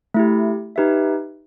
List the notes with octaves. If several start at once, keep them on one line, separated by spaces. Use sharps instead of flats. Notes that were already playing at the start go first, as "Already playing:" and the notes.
A3 E4 G4
D#4 G4 B4 E5